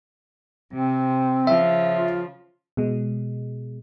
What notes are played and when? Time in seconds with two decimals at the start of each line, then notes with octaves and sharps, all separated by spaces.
0.73 C3 C4
1.47 C#3 F3 E5
1.91 F4
2.77 B2 G#3